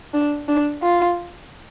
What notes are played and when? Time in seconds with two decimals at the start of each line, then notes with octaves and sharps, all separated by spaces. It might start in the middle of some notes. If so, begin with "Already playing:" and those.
0.14 D4
0.48 D4
0.83 F4